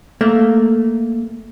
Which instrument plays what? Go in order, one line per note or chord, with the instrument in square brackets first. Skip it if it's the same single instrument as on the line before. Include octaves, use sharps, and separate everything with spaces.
[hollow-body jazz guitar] A3 [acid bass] A#3